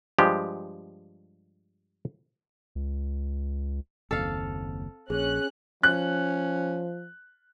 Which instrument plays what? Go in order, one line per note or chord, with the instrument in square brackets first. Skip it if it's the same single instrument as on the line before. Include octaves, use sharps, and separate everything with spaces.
[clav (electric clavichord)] G2 F3 G#3 G4
[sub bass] C#2
[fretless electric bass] F#1 D#2 [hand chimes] C4 [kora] A4 F5
[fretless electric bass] A#1 [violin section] C#4 F#6 [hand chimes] G#4
[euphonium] F3 [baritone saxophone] C#4 [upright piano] F#6